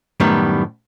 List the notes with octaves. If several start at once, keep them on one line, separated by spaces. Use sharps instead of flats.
F#2 A2 D#3 G3 B3